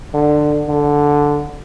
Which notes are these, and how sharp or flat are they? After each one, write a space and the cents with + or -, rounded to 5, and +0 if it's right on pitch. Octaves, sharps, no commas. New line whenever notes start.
D3 +20
D3 -5